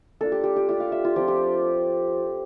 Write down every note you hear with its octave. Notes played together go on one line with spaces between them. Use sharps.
A#3 D4 F4 A4
G4
G4
G4
A3 D4 F4 G4
F5
E5
F4
F3 C4 F4 G4
G4